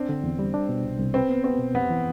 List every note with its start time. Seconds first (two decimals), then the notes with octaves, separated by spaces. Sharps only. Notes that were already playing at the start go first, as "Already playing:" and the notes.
Already playing: C4 D4
0.09 D3
0.24 E2
0.39 G3
0.54 D4
0.69 B2
0.84 C2
1.00 C2
1.14 C4 B4
1.29 B3
1.44 B3 C4
1.59 B2
1.74 F2 B3
1.90 E3